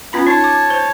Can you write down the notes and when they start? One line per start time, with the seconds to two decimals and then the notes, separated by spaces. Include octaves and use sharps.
0.13 B3 C#4 F4 A#5 B5
0.27 D#4 C#5 A5
0.44 D6
0.70 C5